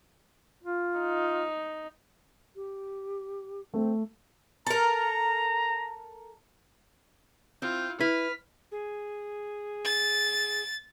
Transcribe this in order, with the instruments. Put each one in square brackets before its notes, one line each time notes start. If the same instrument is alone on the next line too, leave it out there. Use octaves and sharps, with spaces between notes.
[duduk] F4
[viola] D#4
[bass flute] G4
[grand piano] A3 [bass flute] C4
[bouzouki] A4 A#4 [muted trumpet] A#5
[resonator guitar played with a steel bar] C4 [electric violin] E4 F4 [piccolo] G6
[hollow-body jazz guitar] E4 [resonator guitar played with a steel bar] B4 [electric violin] F6 [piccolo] B6
[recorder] G#4
[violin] A6